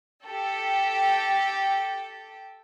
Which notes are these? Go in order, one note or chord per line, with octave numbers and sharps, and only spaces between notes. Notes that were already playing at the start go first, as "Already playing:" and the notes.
G4 A4 G5